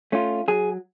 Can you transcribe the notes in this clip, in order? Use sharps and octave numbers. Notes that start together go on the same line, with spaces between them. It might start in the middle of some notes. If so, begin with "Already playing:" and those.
A3 C#4 F4
F#3 G#4